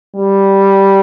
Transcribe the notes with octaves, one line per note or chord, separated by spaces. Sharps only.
G3